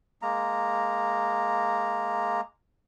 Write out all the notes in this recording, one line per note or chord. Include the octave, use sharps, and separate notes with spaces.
G#3 A#3 A#5